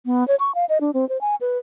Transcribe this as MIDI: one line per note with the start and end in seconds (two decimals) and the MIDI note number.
0.06 0.26 59
0.28 0.35 73
0.40 0.54 85
0.55 0.65 77
0.69 0.78 75
0.81 0.91 62
0.94 1.08 60
1.09 1.20 72
1.21 1.35 80
1.41 1.58 71